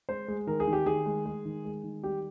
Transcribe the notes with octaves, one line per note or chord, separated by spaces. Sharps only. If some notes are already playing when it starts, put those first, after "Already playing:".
G#3 C5
G#3
D#3 A#4
G#4
D#3
G4
D#3 G#4
G#3
G#3
D#3
G#3
D#3
G3 G4